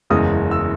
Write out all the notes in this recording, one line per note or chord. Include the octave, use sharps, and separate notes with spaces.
F#1 E2 C#3 G#3 D#6
E6